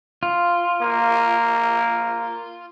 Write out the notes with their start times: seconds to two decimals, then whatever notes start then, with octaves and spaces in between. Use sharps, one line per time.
0.23 F4
0.81 A#3